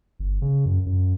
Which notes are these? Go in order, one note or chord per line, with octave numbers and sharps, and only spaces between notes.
G1
C#3
F#2
F#2